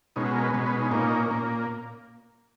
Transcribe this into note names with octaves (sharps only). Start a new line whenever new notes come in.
B2 G#3 C#4 D#4
F#4
A#4
B4
B2 G#3 C#4
B4
D#4
A#2 A#3 C#4 D#4
A#2 A#3 C#4